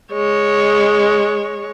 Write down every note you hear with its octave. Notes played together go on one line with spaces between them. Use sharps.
G#3 C#5